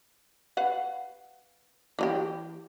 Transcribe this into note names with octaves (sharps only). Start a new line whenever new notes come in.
B4 F5 F#5
E3 D#4 G4